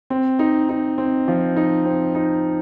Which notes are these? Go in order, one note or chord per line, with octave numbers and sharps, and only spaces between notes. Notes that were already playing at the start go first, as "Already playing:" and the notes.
C4
D#4
D#4
C4
F3
D#4
C4
D#4